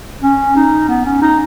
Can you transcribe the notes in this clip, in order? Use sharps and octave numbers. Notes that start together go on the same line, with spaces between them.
C#4
D#4
B3
C#4
D#4